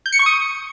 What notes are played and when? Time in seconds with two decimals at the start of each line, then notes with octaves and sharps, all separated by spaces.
0.06 G6
0.12 C#7
0.19 C#6
0.26 D#6